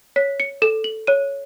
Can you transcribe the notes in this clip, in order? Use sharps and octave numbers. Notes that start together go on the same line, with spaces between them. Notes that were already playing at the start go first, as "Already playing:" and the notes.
C#5 B6
C#7
A4 E7
F#7
C#5 D#7